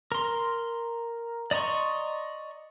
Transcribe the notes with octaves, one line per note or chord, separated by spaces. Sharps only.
A#4 C6
D5 D#5 A#5 C6 C#6